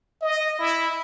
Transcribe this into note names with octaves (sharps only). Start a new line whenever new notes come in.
D#5
E4